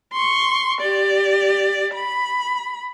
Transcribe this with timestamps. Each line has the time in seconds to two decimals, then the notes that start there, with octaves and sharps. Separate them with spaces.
0.13 C6 C#6
0.81 G4 D5
1.94 B5